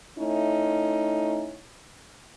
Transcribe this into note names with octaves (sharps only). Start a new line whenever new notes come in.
A3 C#4 D#4 E4